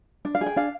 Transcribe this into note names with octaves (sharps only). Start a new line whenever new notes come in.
D4
F5
G#4
G5
D4 F5